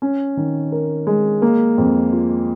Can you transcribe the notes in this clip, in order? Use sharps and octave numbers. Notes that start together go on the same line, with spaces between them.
C#4
D#3
A#4
G#3
A#3
F2
F4